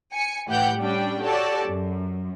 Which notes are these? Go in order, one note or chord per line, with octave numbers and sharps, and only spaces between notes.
G#5 C#7
A2 E3 G4 F#5 G6
G3 C#4 D4 G5
F#4 G4 A4 C#5 D5 A5
F#2